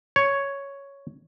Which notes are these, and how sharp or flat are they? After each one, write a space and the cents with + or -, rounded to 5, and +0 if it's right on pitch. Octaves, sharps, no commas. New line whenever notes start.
C#5 +5